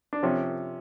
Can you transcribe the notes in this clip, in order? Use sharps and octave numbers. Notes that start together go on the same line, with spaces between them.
D4
C3 F3 C#4